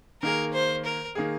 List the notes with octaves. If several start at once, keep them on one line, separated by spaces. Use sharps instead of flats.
D#3 A#3 G#4 A#4
C5
A#4
D#3 A#3 G#4